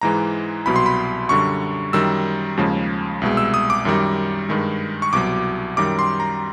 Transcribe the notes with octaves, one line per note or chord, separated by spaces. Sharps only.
G#2 E3 G#3 A#5
C2 B2 F#3 B5
C6
B5
F#2 D3 G3 C#6
F#2 D#3 G3 E6
D#2 C#3 F3 G#3
C2 B2 G#3
E6
D#6
D6
F#2 D#3 G3
G2 D#3 G#3
C#6
C2 B2 F#3 D6
F#2 D#3 G3 D6
C6
A#5